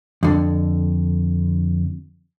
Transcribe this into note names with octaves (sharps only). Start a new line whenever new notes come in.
F2 D3